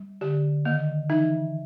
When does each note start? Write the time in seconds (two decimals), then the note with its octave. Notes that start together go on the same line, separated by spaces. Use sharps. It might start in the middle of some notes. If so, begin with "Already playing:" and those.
Already playing: G3
0.21 D3 G4
0.65 D#3 A#3
1.10 E3 D#4